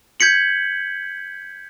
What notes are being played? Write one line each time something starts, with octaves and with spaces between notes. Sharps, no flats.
G6 G#6 B6 C#7 F#7